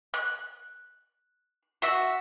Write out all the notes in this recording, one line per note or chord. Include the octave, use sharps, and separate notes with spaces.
F#6
F#4 E5